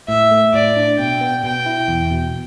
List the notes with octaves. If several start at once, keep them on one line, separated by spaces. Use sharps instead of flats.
A2 E5
A3
A2 D5
D4
B2 G5
B3
B2 G5
E4
E2
B2